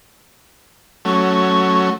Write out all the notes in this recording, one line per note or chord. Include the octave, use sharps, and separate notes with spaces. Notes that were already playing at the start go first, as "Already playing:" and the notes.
F#3 A3 C#4 C#6